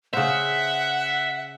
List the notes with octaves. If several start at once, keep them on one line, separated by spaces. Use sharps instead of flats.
C#3 C5 E5 F#5